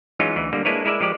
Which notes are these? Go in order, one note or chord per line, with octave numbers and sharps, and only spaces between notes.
E3 F#3 G#3 C#4 D#4 F4
D2 E3
D3 G3 A#3
G#3 A#3 D4 E4 B4 C#5
G#3 E4 A#4 D5 E5
F3 G#3 G4 D5